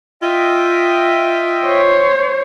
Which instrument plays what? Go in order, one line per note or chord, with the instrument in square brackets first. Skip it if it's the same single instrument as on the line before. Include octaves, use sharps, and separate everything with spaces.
[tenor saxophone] F4 [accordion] D#5 E5 G5
[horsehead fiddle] C5 C#5